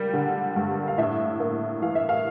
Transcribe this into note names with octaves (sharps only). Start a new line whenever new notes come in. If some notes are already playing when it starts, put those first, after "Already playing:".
Already playing: G3 A#3 G5
D3
G2
F5
A2 E5
A#3
E3 F5
E5
F5